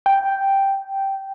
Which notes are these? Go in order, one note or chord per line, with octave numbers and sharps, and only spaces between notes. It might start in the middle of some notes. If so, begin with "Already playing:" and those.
G5